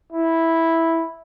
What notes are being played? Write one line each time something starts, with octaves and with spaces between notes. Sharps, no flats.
E4